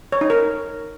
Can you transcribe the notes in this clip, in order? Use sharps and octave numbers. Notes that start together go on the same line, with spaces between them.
C#5
D#4
A#4